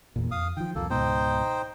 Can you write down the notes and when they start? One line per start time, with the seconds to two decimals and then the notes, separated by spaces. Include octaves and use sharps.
0.16 E2 A#2
0.31 F2 F5 D#6
0.57 D#3 F3 G5
0.75 C2 F2 F3 A#3 A4
0.90 C#2 G#2 B2 D#4 C5 G5